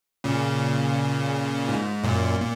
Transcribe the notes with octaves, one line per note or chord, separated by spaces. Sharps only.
A#2 C#3
G#2
F#2 A#2
A#2